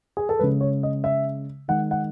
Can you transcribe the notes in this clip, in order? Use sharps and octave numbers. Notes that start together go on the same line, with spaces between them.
G#4
A4
C#3 G#3 B4
C#5
D#5
E5
D#3 G#3 F#5
F#5